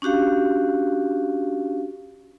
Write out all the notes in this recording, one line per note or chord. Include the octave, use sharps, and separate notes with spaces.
C#4 D4 F#4 G4 F5